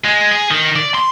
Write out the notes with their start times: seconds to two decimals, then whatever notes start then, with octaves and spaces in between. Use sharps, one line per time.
0.04 G#3
0.31 G#4
0.51 D#3
0.76 D5
0.95 C6